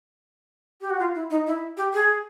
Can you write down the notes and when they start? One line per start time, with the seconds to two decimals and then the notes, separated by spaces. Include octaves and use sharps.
0.81 G4
0.90 F#4
1.00 F4
1.15 E4
1.30 D#4
1.47 E4
1.77 G4
1.94 G#4